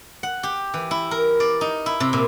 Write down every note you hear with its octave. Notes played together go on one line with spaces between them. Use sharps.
F#5
G4
E3
E4
A#4
D5
D#4
E4
C3
A#2